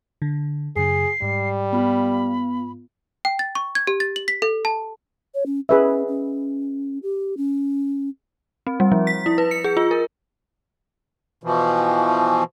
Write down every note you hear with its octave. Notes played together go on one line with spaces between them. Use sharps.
D3
F#2 C#3 G#4 C7
G#2 G3
B3 F4 B5
G5
A6
C#6
G#6
G4
A6
F#7
B6
A4
A5
C#5
C#4
C#4 G#4 B4 E5
C#4
G4
C#4
C4
G3
F3
B6
E4
B4
C#7
G#4
F4
A#4
B2 E3 F3